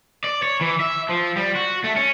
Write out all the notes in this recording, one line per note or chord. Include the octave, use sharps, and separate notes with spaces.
D5
C#5
E3
E5
F3
G3
F#4
A3
C#4